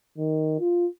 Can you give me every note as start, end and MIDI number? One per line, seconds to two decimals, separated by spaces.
0.18 0.56 51
0.60 0.87 65